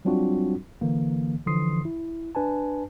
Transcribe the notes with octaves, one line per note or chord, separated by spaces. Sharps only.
F#3 G3 C4 D4 F4 F#4
D3 E3 A#3
D3 E3 F3 C6 D#6 C7
E4
D4 B4 G#5 A5